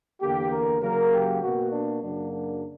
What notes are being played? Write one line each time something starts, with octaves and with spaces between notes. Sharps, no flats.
E2 D3 A#3 G4
A#4
C#3 F#3 A#3 A#4
G4
B2 A#3 F#4
D4
F#2 C#3 F#3 A#3 D4
D4